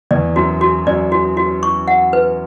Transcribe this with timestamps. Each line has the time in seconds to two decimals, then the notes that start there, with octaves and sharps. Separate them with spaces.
0.11 E2 D5
0.36 F#2 F#4
0.61 F#4
0.87 F#2 D5
1.12 F#4
1.37 F#4
1.63 C#6
1.88 F#5
2.13 B4